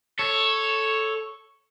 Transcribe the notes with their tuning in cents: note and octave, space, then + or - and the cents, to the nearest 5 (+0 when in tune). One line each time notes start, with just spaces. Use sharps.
A4 +0 C#5 +0